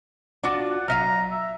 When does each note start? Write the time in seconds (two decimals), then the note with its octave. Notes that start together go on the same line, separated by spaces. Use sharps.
0.43 D4 F4 F#4 D5 D6
0.70 F#5
0.88 F#3 D#5 F5 A#5 F6 B6 D#7
1.31 E5